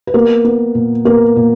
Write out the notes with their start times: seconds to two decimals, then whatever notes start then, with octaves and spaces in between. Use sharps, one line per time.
0.07 B4
0.14 A#3 B3 A#4
0.45 B3
0.75 A#2
1.05 A#3 B3 A#4
1.36 A#2